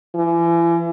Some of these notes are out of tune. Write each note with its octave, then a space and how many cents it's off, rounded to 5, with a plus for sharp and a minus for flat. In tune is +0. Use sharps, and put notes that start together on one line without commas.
E3 +40